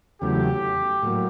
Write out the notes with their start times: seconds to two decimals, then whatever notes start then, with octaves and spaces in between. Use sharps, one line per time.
0.21 E2 C#3 F#3 A3 G4
1.03 A2 F#3 A#3